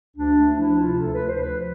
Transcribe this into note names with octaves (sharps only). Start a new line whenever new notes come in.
D2 D4
D2
F3 E4
C3 F4
D2 A4
B4
D2
C5
F3 B4